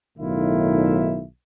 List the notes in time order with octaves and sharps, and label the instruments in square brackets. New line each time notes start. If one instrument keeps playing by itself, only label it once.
[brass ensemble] B1 A2 D#3 E4 F4 E5